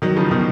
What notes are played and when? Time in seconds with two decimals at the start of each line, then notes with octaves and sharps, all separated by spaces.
0.02 D#3 F#3
0.17 C#3 F3
0.31 B2 D#3